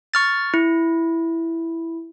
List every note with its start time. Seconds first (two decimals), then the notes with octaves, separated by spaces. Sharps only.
0.14 C#6 F6 A6
0.54 E4